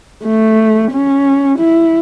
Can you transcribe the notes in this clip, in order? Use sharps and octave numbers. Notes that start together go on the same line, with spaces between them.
A3
C#4
E4